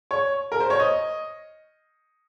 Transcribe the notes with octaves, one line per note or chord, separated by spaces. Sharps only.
C#5
A#4
C5
C#5
D#5